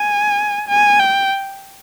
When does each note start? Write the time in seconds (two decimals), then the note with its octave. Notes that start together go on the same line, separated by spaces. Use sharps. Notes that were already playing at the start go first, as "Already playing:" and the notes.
Already playing: G#5
0.68 G#5
0.99 G5